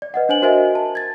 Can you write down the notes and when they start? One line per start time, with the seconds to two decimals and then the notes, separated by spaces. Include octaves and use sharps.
0.02 D5
0.14 B4 D#5 F#5
0.29 D4 C5 G#5 F#7
0.42 F#4 A#4 C5 D#5 E5 G#5
0.75 A5
0.95 G#6 A6